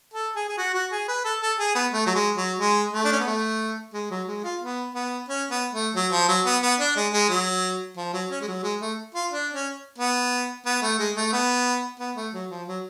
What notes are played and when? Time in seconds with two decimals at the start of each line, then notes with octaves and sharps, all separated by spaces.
0.14 A4
0.36 G#4
0.49 G#4
0.58 F#4
0.74 F#4
0.92 G#4
1.08 B4
1.25 A4
1.41 A4
1.59 G#4
1.75 B3
1.93 A3
2.06 F#3
2.15 G#3
2.37 F#3
2.59 G#3
2.93 A3
3.05 D4
3.12 C#4
3.20 B3
3.26 A3
3.94 G#3
4.10 F#3
4.27 G#3
4.44 F4
4.61 B3
4.95 B3
5.28 C#4
5.51 B3
5.73 A3
5.95 F#3
6.12 F3
6.29 F#3
6.46 B3
6.62 B3
6.80 D4
6.96 G#3
7.13 G#3
7.30 F#3
7.97 F3
8.13 F#3
8.30 C#4
8.41 G#3
8.48 F#3
8.64 G#3
8.81 A3
9.15 F4
9.32 D4
9.53 C#4
9.98 B3
10.66 B3
10.82 A3
10.99 G#3
11.16 A3
11.33 B3
12.00 B3
12.16 A3
12.34 F#3
12.51 F3
12.68 F#3